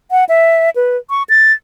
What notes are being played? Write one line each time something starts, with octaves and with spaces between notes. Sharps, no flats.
F#5
E5
B4
C#6
A6